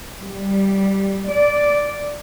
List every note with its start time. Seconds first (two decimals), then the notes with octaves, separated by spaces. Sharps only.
0.21 G3
1.29 D5